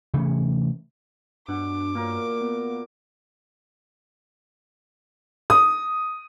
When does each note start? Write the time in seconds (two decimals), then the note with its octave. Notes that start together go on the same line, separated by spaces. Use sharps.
0.14 C3 E3 A3 C#4
1.48 G2 B2 D4 F#5 D6
1.95 A#2 A#3 A#4
2.41 B3
5.50 D#6